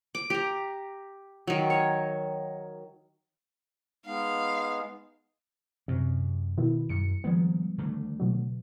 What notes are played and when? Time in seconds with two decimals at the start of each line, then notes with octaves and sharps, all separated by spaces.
0.15 D6
0.30 G4 A#5
1.47 D#3 F#3
1.70 C#5
4.06 G#3 B3 D#4 F5
5.88 F#2 C3
6.58 B2 D#3 E4
6.89 F#2 C#7
7.24 D#3 F3 G3 G#3 B3
7.78 D3 D#3 A3
8.20 B2 F#3